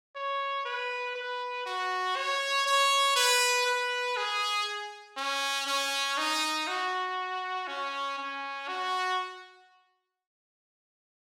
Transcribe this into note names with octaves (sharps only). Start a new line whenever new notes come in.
C#5
B4
B4
F#4
C#5
C#5
B4
B4
G#4
C#4
C#4
D#4
F#4
C#4
C#4
F#4